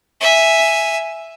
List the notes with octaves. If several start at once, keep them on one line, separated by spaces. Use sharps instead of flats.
E5 G#5